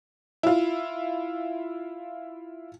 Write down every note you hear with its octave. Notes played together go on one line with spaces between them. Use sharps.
E4 F4